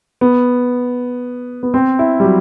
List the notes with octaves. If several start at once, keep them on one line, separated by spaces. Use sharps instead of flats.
B3
B3
C4
E4
G3
F#3